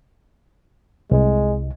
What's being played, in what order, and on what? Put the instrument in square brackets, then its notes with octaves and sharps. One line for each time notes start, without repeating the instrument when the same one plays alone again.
[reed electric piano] C2 [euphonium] G#3